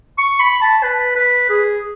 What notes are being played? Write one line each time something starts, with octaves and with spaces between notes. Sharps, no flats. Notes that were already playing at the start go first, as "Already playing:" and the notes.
C#6
B5
A5
B4
B4
G#4